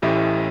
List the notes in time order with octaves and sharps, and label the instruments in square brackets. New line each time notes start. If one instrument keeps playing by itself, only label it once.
[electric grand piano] A1 A2 E3 A3 C#4 [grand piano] E4 G4